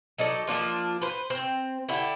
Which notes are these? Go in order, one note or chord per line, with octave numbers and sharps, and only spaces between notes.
F#3 D#4 A4 D5
F3 A#3 D4 F4
B4 C5
C4
D3 E4 G4